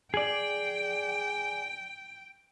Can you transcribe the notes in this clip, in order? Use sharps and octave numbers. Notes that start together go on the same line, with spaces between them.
G#4 D5 G5